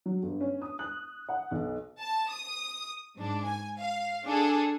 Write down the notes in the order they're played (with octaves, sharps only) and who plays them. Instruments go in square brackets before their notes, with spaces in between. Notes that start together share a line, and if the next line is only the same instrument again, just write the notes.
[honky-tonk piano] F#3
G1
C#4
D#6
F#6
F#5
B1
[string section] A5
D#6
G#2 D4
G#5
F5
D4 G#4 A4